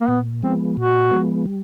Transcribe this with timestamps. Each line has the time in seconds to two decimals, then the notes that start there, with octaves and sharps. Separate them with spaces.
0.01 A#3
0.08 A#2 B3
0.43 F3 G#3 B3 C4
0.77 A#2 F#4
1.11 F3 G#3 B3
1.46 G3